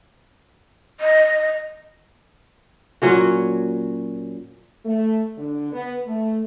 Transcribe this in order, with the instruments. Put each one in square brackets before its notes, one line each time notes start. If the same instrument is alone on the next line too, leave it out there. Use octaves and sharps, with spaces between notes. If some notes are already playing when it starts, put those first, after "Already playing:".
[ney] D#5
[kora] A#2 F#3 C#4 F#4
[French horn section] A3
D3
B3
A3